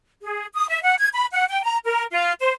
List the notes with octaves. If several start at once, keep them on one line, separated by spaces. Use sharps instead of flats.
G#4
D#6
E5
F#5
G#6
B5
F#5
G5
A#5
A#4
F4
C5